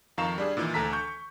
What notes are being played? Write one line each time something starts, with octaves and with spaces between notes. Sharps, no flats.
F2 D#3 F5 A#5 C#6 E7
G3 D4 G#4
A#2 D#3 E3
D2 A4 A#5 B6
C#6 G6